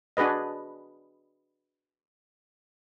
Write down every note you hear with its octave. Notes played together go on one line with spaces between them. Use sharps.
D4 F#4 G#4 B4 D#5